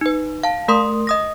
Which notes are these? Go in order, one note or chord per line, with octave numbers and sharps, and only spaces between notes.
D#4 B4
F5 A5
A3 A#4 C6 D#6
D#5 D#6 A#6